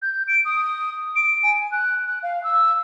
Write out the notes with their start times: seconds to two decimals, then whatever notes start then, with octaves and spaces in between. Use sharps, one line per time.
0.02 G6
0.28 D7
0.45 D#6
1.16 D7
1.43 G#5
1.72 F#6
2.07 F#6
2.23 F5
2.44 E6